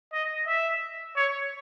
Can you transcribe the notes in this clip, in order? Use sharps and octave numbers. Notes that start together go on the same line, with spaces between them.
D#5
E5
C#5